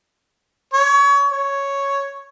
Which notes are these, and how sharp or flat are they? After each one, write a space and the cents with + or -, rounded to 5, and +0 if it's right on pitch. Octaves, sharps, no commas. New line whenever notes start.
C#5 +25
C#5 +0